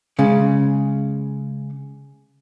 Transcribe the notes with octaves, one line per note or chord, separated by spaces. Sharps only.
C#3 G#3